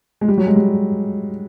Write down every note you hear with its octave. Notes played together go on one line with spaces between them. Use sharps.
G#3
G3
F#3
G#3
G3